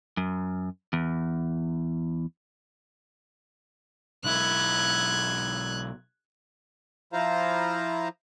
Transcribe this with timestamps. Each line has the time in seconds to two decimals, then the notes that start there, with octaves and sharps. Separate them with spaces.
0.17 F#2
0.93 E2
4.24 B1 E4 F#6 G#6
7.13 F3 E4 F4 C5 F5 A#5